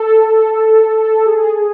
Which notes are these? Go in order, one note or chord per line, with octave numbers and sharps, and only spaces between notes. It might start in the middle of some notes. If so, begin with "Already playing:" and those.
Already playing: A4
G#4